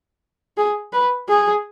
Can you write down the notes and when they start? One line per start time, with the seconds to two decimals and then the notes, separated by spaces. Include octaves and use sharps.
0.57 G#4
0.93 B4
1.29 G#4